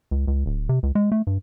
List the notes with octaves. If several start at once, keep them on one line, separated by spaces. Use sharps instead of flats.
C#2
C#2
D1
C3
C#2
G#3
A3
G2